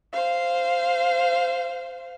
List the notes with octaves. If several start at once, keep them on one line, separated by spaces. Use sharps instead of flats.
C5 F5